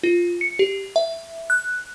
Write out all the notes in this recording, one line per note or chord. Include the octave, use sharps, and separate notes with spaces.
F4
C#7
G4
E5
F#6